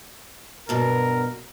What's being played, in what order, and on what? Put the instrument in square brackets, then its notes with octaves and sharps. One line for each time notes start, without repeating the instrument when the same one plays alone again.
[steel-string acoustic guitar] G2 B2 F#3 [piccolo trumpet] A#4